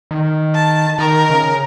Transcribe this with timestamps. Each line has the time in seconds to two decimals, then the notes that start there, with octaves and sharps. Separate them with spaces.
0.11 D#3
0.55 A5
0.99 D#3 A#4
1.30 C#3